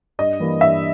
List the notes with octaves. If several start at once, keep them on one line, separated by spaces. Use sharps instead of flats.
G2 D#5
E3 G3 A#3
G2 E5